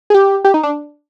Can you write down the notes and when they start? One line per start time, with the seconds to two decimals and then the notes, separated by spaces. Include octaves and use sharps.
0.10 G#4
0.14 G4
0.45 G4
0.54 D#4
0.63 D4